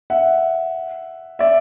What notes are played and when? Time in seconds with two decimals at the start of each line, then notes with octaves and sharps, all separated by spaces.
0.10 E5 F#5
1.39 D5 E5